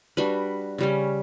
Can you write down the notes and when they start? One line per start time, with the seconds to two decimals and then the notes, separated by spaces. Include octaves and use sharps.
0.17 G3 D4 F#4 B4
0.78 C#3 G3 C#4